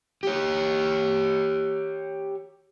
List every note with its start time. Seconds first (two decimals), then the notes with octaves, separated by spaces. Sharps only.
0.23 G4 C#5